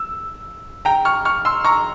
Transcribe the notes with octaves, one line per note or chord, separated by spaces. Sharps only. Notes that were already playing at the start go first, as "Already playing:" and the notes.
Already playing: E6
G5 A#5
C#6 F6
C#6 F6
C6 E6
A#5 C#6